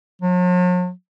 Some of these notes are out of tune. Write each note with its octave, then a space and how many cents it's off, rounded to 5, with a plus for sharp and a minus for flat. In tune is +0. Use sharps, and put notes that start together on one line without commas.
F#3 -45